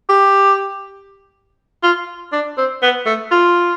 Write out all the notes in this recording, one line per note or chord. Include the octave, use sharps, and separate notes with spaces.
G4
F4
D4
C4
B3
A3
F4